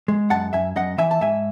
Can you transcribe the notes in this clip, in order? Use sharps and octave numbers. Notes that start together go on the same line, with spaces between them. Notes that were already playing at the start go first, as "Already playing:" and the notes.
G#3
F#2 F#5 A5
F#2 E5 G#5
F#2 D#5 F#5
E3 E5 G#5
A5
G#2 E5 G#5